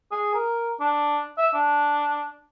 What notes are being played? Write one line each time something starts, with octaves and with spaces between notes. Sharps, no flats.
G#4
A#4
D4
E5
D4